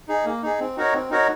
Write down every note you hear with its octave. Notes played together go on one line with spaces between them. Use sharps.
D#4 G#4
A#3
D#4 G#4
C4
D#4 F#4 A#4 C#5
C4
D#4 F#4 A#4 C#5